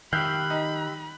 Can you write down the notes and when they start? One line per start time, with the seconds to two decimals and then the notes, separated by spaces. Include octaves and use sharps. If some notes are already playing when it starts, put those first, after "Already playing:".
0.13 D#3 G4 E5 F5 B5 F#6 G6
0.50 D#4